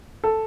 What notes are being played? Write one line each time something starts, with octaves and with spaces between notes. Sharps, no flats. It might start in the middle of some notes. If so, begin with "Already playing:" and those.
A4